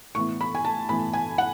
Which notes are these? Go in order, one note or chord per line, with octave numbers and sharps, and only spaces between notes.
A2 E3 B3 C#6
B5
G#5
A5
A2 E3 B3 B5
G#5
F#5